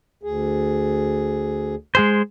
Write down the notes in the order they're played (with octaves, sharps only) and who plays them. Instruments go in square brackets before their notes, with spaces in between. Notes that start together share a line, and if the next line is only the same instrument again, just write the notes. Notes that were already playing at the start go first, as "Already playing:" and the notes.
[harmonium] D2 G#4
[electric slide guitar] G#3 G#4 C5